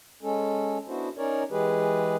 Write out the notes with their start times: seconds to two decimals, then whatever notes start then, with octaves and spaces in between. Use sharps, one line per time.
0.23 G#3 C#4 A4
0.88 B3 D4 E4 F#4 C5
1.17 C#4 D#4 A#4 C#5 D5
1.51 E3 G#3 G4 G#4 B4